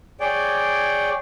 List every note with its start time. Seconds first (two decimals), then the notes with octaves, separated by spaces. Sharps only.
0.20 G#4 C#5 D5 G5